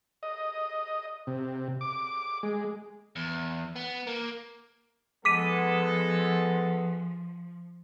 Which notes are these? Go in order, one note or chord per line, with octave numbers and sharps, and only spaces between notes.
D#5
C3
D6
G#3
E2
B3
A#3
F3 G#3 B3 A4 D6 B6 D#7